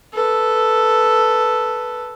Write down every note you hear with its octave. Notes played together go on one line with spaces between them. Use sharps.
A4 B4